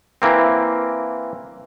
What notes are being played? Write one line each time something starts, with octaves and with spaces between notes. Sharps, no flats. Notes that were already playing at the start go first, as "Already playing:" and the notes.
E3 A#3 C4